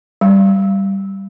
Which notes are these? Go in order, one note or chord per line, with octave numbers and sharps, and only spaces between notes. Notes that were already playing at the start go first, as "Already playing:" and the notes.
G3